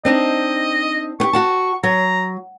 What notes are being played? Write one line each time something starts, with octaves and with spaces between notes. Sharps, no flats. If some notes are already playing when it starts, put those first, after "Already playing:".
C4 D4 D#4 D#5
B3 G4 C#6
F#4 F#5 A5
F#3 A#5